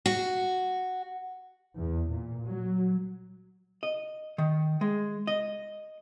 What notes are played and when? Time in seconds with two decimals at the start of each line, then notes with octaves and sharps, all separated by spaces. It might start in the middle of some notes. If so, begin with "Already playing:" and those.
0.06 F#4
1.78 E2
2.10 A#2
2.46 F#3
3.83 D#5
4.38 D#3
4.81 G#3
5.27 D#5